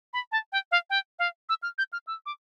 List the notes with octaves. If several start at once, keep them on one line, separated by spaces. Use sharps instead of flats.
B5
A5
G5
F5
G5
F5
E6
F6
G6
F6
E6
D6